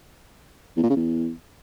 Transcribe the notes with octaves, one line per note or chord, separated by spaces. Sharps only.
E2
A#2
C#3
E2